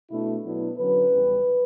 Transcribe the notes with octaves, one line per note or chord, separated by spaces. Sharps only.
B2 A3 D4 E4
B2 F#3 B3 D4 E4
D3 F#3 C#4 B4
E2 C#3 G3